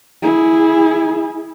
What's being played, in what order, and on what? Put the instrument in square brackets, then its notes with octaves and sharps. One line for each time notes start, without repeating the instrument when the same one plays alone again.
[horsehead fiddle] E4 G#4